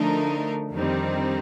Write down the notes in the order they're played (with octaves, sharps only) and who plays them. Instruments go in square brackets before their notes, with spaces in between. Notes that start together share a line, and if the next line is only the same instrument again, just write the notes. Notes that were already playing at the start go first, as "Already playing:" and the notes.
Already playing: [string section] D3 F3 A3 D#4 A#4 [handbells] D4
[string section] F2 D#3 G3 C4 D#4